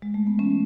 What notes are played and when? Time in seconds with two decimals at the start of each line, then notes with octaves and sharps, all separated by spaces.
0.02 G#3
0.14 A3
0.27 B3
0.39 E3 A3 C#4